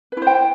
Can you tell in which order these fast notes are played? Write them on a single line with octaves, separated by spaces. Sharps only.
B4 E4 C5 G5